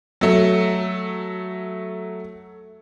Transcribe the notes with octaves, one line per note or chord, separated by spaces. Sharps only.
F#3 A3